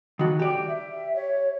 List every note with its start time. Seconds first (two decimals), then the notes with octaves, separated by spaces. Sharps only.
0.19 D#3 F#4
0.39 G4 D5
0.68 E5
1.16 C#5